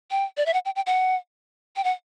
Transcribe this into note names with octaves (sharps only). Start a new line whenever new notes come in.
G5
D5
E5
F#5
G5
G5
F#5
G5
F#5